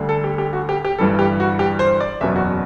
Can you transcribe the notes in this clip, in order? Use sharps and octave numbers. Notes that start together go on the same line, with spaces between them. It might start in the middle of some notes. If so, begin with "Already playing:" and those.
Already playing: D2 D3 G3
A4
G4
G4
F#4
G4
G4
G1 G2 E3 G3 A4
G4
F#4
G4
C5
D5
F#1 E2 B2 F#3 E5
F#4